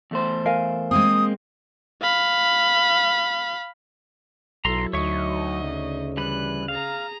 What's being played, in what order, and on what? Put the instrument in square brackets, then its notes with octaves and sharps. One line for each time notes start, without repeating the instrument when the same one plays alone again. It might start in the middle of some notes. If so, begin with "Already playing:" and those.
[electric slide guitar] E2 A3 C5
[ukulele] A#4 F5 G#5
[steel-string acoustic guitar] G#3 A#3 C4 [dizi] D#6
[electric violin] F5 B5
[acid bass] B1 [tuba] F#3 [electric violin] E4 A4 [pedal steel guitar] A#5 C6
[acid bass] D2 [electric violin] D#4 D#5 [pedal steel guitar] C#5 E5 C#6
[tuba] C#3
[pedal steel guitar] E3 G3 B4 [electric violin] F#6
[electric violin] G#4 A#5 [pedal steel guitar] F5